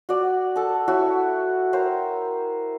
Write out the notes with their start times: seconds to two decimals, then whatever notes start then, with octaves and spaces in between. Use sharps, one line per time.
0.09 F#4 D5
0.56 A4 A5
0.88 E4 F#4 C#5
1.73 A#4 C5 C#5 G5